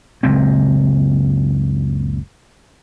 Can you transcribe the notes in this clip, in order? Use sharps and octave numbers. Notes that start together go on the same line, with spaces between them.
F#1 C#2 A#2 C4